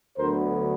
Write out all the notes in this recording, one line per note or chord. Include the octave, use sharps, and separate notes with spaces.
D2 D3 F#3 B3 A#4 C5